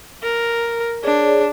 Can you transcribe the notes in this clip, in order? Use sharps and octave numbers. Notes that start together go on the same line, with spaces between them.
A#4
D4 G#4 C#5 D5